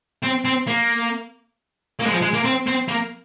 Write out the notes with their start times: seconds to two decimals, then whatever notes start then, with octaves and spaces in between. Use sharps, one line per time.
0.23 C4
0.45 C4
0.67 A#3
1.99 A#3
2.06 G#3
2.11 F3
2.22 G#3
2.33 A#3
2.44 C4
2.67 C4
2.88 A#3